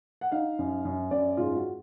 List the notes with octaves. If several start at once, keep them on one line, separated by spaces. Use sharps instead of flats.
F#5
D#4 F5
F#2
F#2
F#2 D5
G#2 F4
F#4